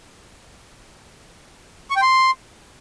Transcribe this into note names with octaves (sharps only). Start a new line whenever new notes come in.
C#6
G5
C6